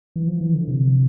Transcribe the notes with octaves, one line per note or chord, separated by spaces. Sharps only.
E3
F3
E3
D3
C3